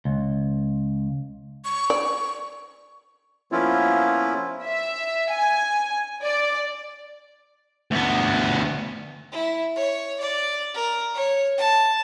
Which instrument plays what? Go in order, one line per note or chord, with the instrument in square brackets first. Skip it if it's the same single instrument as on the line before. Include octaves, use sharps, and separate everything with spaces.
[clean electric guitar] C#2
[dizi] C#6
[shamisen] D5
[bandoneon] F3 A#3 B3 C#4 E4 F4
[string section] E5
G#5
D5
[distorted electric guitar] D2 B3
[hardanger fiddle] E4
C#5
D5
A#4
C#5
A5